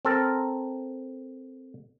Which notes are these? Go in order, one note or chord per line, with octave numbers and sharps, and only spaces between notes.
C4 A4 A#4